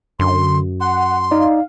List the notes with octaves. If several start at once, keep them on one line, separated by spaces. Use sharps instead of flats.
F#2 D3 C6
F#5 C6
D#4 D5 F5